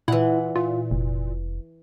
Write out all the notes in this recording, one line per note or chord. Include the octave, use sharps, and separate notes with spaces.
A#2 E3 E4 F#5
A#2 F4
F1